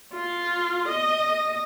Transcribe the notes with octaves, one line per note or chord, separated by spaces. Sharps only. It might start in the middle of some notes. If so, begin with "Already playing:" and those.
F4
D#5